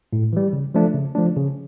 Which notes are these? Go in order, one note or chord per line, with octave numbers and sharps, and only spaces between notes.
A2
E3 G3
C#3
F3 A3 D4
C#3
F3 A3 D4
C#3